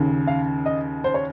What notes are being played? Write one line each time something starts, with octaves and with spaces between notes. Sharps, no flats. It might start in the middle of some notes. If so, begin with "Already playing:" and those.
Already playing: D#2 C#3
F5
D#5
C5
C#5